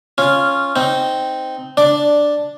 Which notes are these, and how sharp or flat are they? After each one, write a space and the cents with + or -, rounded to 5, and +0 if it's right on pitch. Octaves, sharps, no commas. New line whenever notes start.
C#4 +0 F4 -5
C4 -10 D#4 +0
D4 +0 D5 +0